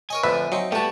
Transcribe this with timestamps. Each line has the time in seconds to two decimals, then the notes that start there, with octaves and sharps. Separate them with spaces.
0.10 A#4 C#5 D#5 G#5
0.23 F2 A2 D3 B4 E5
0.52 F#3 C4 D#4
0.72 G3 A3 B3 F#4 G5 A5